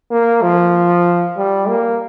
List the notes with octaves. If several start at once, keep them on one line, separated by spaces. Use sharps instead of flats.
A#3
F3
G3
A#3